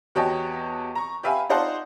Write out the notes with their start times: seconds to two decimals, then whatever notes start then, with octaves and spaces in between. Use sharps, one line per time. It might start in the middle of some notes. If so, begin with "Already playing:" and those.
0.15 E2 F#4 G4 C#5 D#5 A5
0.95 A#5 C#6
1.23 G4 B4 E5 F5 G#5
1.49 D#4 F4 C5 D5 F#5 A5